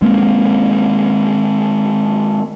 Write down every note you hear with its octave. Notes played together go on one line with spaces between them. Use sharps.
G#3 A#3 C4